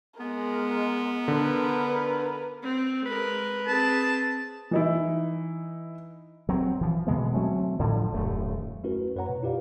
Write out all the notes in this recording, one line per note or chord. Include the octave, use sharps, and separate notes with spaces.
G#3 B3 A#4
D3 A#4 B4
C4
G#3 A#4 B4
C4 G#4 A5
E3 D#4 E4
F#3 C4
E3 F3
B2 D3 G#3 B3
F#3 A3 C4 C#4
A2 D3 F3 G3
D#1 F#2 A3
A3 C#4 E4 F#4 A#4 B4
F#2 B4 C#5 F#5 A#5
B2
E4 F4 G4 B4 D5 F5